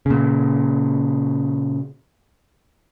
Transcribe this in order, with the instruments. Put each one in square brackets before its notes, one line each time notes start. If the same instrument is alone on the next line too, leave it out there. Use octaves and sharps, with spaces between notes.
[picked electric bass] A#2 C#3